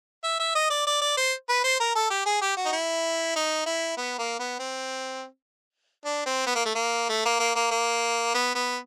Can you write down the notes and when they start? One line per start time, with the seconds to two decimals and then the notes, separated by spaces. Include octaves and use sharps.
0.23 E5
0.39 E5
0.55 D#5
0.70 D5
0.87 D5
1.01 D5
1.17 C5
1.49 B4
1.64 C5
1.80 A#4
1.95 A4
2.10 G4
2.26 G#4
2.41 G4
2.57 F#4
2.66 D#4
2.72 E4
3.36 D#4
3.66 E4
3.97 B3
4.18 A#3
4.40 B3
4.59 C4
6.05 D4
6.26 C4
6.46 B3
6.55 A#3
6.65 A3
6.75 A#3
7.09 A3
7.25 A#3
7.40 A#3
7.56 A#3
7.71 A#3
8.34 B3
8.55 B3